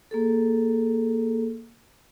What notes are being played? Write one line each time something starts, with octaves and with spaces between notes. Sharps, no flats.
A#3 G#4 A4